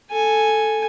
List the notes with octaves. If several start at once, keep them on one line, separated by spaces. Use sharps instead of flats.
A4 G#5